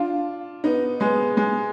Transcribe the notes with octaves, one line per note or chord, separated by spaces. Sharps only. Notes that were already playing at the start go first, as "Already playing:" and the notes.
Already playing: D4 F4
B3 D#4
G#3 B3
G#3